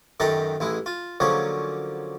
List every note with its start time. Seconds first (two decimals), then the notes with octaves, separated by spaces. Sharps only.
0.20 F#2 D#3 G4 A4 F#5 A#5
0.60 A1 G#3 E4
0.86 F4
1.20 D3 F3 F#3 A#3 C#4 G#4